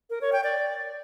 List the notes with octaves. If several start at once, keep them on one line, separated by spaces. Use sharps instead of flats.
A#4
C#5
G5
D5